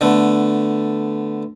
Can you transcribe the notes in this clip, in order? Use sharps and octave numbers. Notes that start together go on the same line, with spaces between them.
D3 A3 B3